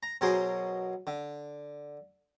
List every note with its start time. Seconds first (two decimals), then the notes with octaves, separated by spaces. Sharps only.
0.03 A#5
0.21 B2 F#3 G#4 A#4 C5
1.07 D3